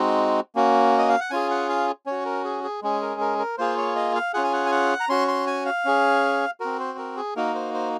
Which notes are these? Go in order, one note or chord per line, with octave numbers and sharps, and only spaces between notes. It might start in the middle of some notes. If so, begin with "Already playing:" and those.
Already playing: G#3 C4 D#4 F#4
A#3 C#4 F#4
D#5
F5
F#5
C#4 F4 G#4 G#5
F#5
F5
C#4 F#4 C#5
A#4
G#4
G#4
G#3 C#4 G#4
A#4
A#4
A#4
A#3 F4 G#4 C5
C#5
D#5
F5
C#4 F4 G#4 F#5
G#5
F#5
G#5
F#5
A#5
C#4 F#4 C6
C6
G#5
F5
C#4 G#4
C4 F#4 A#4
C5
A#4
G#4
A#3 D#4 F#4 A#4
C5
C5